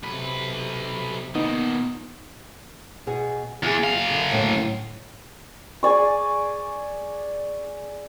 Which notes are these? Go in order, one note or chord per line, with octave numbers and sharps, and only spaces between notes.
B1 C3 B4
A#2 D#3 B3 D#4
B2 B3 G#4
E2 F4 G#4
F#2 F5
D3
D#2 A2 D3
G#4 D5 C#6